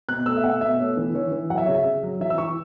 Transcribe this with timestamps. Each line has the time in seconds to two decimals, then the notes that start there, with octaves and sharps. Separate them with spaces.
0.08 B2 F#6
0.26 A3 E6
0.37 E5
0.43 B2 F#5
0.61 B2 E5
0.79 A3 C#5
0.97 E3
1.14 E3 C#5
1.32 E3
1.50 F#3 F#5
1.58 E5
1.66 C#3 C#5
1.74 E5
1.85 C#3
2.03 F#3
2.20 E3 E5
2.30 E6
2.38 E3 C#6